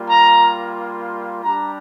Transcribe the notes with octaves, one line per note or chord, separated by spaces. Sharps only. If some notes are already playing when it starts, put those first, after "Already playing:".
Already playing: G3 A#3 F4
A#5
G3 D4 G4 A#5